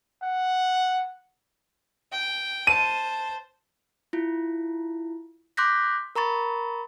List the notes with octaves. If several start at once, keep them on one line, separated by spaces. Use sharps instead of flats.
F#5
G5
C5 A5 D#7
E4 F4
C6 D6 F#6 G6 A#6 B6
A#4 A#5 B5 C#6 A6